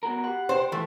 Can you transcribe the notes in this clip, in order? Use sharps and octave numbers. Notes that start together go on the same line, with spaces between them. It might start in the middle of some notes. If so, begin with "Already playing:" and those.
B3 F#4 A#4
G4 F#5 B5
B4 C5 G5
E3 F3 A3